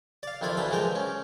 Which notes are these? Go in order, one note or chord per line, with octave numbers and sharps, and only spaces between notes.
D5 F5
F2 D#3 E4 F4 D5
D2 E3 A3 B5
E3 F3 G#3 A#4 G5
C#4